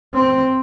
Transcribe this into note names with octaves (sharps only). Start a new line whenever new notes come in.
C4